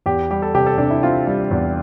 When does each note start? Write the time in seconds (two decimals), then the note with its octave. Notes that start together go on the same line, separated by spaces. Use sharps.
0.06 E2 G4
0.31 G3 G4
0.42 A4
0.55 C3 G4
0.66 A4
0.78 C3 D4
0.90 E4
1.03 C4 F4
1.27 G3
1.51 E2